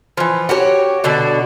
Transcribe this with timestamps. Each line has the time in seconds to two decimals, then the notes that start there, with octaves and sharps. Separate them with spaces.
0.17 E3 F3
0.49 F#4 G4 A4 C#5
1.04 B2 D3 D4 F#4